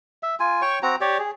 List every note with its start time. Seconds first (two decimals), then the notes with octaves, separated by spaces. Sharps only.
0.23 E5
0.40 F4 G#5
0.62 C#5 G5 C#6
0.83 C4 F#4 A#5
1.01 G4 C#5 D5
1.19 G#4